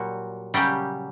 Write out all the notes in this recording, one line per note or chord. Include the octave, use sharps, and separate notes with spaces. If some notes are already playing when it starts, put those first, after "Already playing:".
Already playing: A#2 F#3 G3 F#4
C#3 F#3 G3 G4